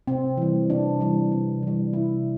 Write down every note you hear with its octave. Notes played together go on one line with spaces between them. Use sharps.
C3 C4
E3 G3
C3 D4
E3 G3
C3
E3 G3
C3 E4